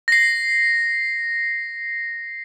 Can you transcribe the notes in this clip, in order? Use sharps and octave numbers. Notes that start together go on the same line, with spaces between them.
A#6 C7